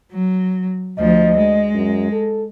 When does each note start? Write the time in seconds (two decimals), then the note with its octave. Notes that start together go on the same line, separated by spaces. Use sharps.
0.12 F#3
0.98 D2 F3 D#5
1.38 G#3
1.74 F#2
2.12 A4